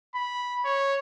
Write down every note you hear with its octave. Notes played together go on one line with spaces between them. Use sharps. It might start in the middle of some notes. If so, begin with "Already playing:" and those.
B5
C#5